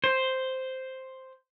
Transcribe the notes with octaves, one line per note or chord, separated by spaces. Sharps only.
C5